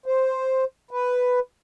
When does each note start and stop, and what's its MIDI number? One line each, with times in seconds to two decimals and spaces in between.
0.06 0.64 72
0.91 1.39 71